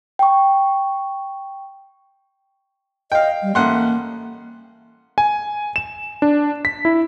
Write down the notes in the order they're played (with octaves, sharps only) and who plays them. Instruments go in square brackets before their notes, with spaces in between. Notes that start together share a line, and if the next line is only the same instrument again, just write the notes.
[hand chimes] G5 C#6
[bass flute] D#5 [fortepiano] F5 G5
[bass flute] G3
[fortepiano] A1 F#5 C6 [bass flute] A#3
[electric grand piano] G#5
E7
D4
B6
E4